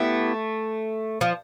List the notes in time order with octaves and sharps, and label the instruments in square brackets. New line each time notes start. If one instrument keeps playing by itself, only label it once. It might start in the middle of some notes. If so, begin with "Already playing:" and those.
Already playing: [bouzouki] A3 [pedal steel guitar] B3 E4 G4
[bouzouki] F3